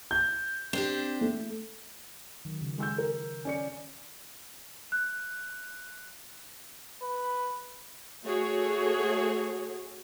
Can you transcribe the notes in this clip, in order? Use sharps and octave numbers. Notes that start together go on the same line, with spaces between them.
G6
C4 D4 G4
A3
D#3 F#3
C#3
G#3 E6 G6
A#4
C#4 D5 C#7
F#6
B4
A3 F#4 G#4 C#5